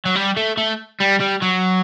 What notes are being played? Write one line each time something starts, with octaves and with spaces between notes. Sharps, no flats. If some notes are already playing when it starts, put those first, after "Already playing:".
F#3
G3
A3
A3
G3
G3
F#3